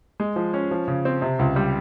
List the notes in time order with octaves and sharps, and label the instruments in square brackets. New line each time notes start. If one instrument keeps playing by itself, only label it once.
[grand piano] G#3
F3
C#4
F3
C#3
C4
C3
C#2
G3